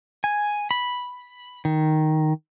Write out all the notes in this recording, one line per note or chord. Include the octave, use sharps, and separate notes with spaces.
G#5
B5
D#3